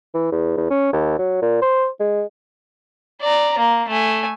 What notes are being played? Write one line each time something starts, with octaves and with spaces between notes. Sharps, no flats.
E3
E2
E2
C#4
D#2
F#3
A#2
C5
G#3
D5 A#5
A#3
A3 G#5